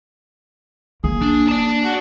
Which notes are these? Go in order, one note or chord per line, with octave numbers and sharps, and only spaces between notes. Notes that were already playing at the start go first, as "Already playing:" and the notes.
A#3 G#4
D4
D5 A5
F#4